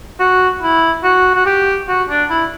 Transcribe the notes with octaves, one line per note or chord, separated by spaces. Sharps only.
F#4
E4
F#4
F#4
G4
F#4
D4
E4